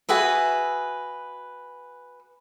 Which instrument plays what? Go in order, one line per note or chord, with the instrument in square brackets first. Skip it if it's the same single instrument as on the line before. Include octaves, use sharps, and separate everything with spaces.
[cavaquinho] F#4 G#4 B4 E5